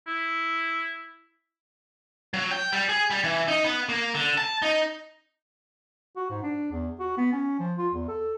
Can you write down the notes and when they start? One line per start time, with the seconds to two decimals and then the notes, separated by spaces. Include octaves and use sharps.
0.07 E4
2.34 F#3
2.51 G5
2.73 G3
2.89 G#4
3.10 G3
3.24 E3
3.48 D#4
3.65 B3
3.89 A#3
4.15 D3
4.38 A5
4.62 D#4
6.16 F#4
6.30 G#2
6.43 D4
6.71 E2
7.00 F#4
7.17 B3
7.33 C#4
7.60 F3
7.78 F4
7.94 E2
8.08 A4